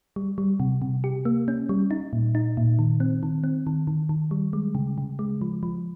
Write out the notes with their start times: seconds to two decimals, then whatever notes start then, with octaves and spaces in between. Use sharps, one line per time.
0.16 G3
0.38 G3
0.60 C3
0.82 C3
1.04 G4
1.25 A#3
1.48 C#4
1.69 G3
1.91 D#4
2.13 A#2
2.35 D#4
2.57 A#2
2.79 D#3
3.00 C4
3.23 D#3
3.44 C4
3.67 D#3
3.87 D#3
4.09 D#3
4.31 G3
4.53 G#3
4.75 C#3
4.98 C#3
5.19 G#3
5.41 F3
5.63 F3